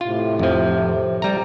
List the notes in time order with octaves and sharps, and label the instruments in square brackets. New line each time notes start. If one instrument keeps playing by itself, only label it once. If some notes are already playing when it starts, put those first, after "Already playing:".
[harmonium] A2 C3 [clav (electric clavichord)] F4
[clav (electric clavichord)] F2 F3
G3 A#5